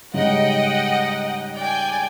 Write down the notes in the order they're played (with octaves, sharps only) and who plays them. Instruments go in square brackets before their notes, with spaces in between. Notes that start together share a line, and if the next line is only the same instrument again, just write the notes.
[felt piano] G#2 C#3 G3 [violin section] D#5 F#5 G5
[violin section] D5 G5 G#5